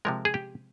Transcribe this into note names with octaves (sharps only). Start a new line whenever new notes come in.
C3 F3 G#3 A#4
G#4
G4